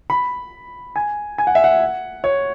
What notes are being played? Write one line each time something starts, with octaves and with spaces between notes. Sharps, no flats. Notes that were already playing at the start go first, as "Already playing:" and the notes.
B5
G#5
G#5
F#5
E5
F#5
C#5